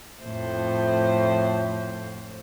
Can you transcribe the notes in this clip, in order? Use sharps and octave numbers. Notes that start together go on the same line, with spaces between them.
F2 A2 C5